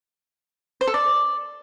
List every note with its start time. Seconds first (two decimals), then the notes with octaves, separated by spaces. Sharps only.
0.81 C5
0.87 A4
0.94 D5